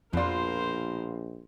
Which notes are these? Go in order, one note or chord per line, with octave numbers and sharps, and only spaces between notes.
A#1 F2 B2 F4 A#4 C5 D5